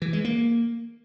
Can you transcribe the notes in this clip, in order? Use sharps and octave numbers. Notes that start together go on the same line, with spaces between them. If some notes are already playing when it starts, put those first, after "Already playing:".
E3
G#3
A#3